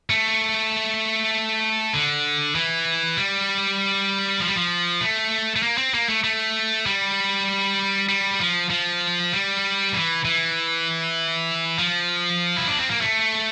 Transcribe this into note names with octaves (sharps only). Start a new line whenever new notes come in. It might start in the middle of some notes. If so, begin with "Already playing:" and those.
A3
D3
E3
G3
F3
G3
F3
A3
A3
A#3
C4
A#3
A3
A3
G3
G3
F3
F3
G3
E3
E3
F3
E4
D4
C4
A#3
A3